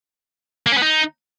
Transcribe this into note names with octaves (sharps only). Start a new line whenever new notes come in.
A#3
C#4
B3
D#4